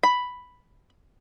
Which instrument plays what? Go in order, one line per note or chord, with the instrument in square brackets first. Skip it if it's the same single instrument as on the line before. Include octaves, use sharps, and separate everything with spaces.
[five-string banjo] B5